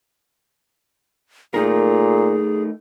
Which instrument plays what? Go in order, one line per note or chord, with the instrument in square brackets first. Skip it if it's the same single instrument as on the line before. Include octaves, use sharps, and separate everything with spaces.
[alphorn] A#2 [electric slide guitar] A3 D#4 A#4 [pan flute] G#4